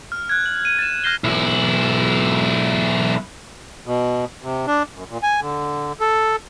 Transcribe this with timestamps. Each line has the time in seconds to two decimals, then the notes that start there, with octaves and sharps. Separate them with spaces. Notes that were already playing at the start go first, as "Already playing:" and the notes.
0.12 F6
0.29 F#6 G#6
0.46 F#7
0.65 D#7
0.79 A6 D#7 E7
1.04 F6 G6 A#6 C7 G7
1.24 B1 E4
3.86 B2
4.42 C3
4.67 D4
4.93 F#2
5.10 A#2
5.23 G#5
5.40 D3
6.01 A4